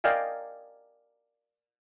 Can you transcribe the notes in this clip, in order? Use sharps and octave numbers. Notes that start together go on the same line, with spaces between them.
A#4 D5 D#5 F5 G5 G#5